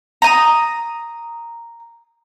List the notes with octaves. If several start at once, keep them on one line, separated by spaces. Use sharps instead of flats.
A#5 D#6